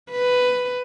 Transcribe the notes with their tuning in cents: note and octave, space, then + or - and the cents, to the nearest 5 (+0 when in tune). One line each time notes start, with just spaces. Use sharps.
B4 +10